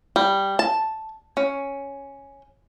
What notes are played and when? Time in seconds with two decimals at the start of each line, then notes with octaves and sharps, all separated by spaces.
0.16 G3
0.59 A5
1.37 C#4